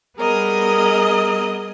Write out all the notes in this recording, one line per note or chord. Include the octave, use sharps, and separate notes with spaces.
G3 B3 G#4 A#4 D#5